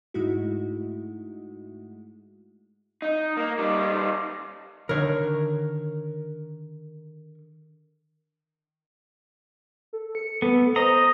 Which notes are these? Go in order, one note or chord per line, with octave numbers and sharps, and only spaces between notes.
G#2 G#3 A3 D#4 E4 F#4
D#4
A#3
G3 D#4
D3 D#3 A#4 C#5
A4
C#7
B3 A4
C5 D#5 A#5